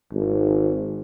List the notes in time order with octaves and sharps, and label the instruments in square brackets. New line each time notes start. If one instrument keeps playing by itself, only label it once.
[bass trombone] G#1